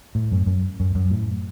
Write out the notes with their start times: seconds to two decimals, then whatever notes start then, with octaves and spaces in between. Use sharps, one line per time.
0.15 A2
0.31 F#2
0.46 F#2
0.80 F#2
0.95 F#2
1.11 A2